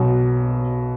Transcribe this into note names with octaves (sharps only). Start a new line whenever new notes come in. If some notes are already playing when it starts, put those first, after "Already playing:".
Already playing: B1 B2 F#3